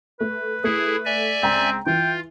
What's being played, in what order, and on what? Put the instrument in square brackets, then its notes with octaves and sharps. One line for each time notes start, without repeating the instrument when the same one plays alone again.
[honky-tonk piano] A3 [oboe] B4
[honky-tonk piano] A3 C#7 [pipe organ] E4 G#4
[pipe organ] D5 E5 G#5
[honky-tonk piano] C#2 G5 A#5 [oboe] C4
[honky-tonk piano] E3 [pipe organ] F4 [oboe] G5